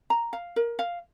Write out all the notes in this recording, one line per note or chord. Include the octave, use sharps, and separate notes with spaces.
A#5
F5
A#4
F5